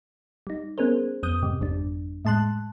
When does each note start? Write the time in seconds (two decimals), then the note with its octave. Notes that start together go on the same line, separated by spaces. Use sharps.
0.47 G3 D#4
0.78 B3 C#4 G#4 A#4 C5
1.23 F2 B3 D#6 G6
1.42 G#2 C3 G3
1.61 G1 F2 G3 D4
2.25 A2 G#3 A5 C6 F#6